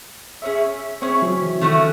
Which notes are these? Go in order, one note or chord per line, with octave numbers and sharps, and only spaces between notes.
C#4 G#4 C#5 E5
C4 C#4 G#4 C#5 E5
F#3
E3
D#3 A3 C#4 F#4